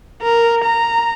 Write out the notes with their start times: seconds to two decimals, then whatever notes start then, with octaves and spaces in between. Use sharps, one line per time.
0.22 A#4
0.64 A#5